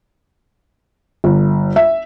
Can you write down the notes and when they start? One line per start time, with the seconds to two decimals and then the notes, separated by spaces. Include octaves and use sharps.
1.24 G1
1.76 E5